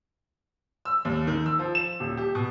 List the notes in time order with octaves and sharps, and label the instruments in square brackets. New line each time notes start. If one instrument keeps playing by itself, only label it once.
[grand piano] E6
D#2
D#3
E6
F3
E7
D#1
G4
B2